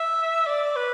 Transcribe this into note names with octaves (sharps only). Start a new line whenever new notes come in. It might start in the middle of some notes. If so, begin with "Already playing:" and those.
Already playing: E5
D5
B4